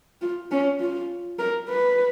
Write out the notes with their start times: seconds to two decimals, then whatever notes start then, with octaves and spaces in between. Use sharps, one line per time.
0.21 F4
0.51 C#4
0.80 F4
1.39 A#4
1.68 B4